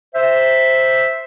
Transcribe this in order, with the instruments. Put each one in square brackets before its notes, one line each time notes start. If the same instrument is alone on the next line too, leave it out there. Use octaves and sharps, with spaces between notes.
[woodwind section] C5 E5